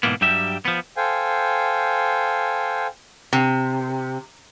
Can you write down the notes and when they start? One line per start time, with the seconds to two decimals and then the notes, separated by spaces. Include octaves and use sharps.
0.03 G#2 B2 D#3 E3 A#3 B3
0.21 G2 F#3 G3 G4 E5
0.65 F3 B3
0.96 A4 C5 F5 G5 G#5
3.33 C3